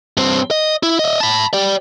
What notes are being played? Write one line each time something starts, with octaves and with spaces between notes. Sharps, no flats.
G2 C4
D#5
E4
D#5 E5
A5 B5
G4 D5